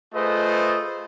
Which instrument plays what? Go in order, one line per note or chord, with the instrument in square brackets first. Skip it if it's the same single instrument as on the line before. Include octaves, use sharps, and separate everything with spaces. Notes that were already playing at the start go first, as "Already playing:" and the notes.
[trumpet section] A3 F4 G#4 B4 C5 D#5